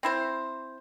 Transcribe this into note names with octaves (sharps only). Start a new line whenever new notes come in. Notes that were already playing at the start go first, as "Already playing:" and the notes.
C4 E4 C5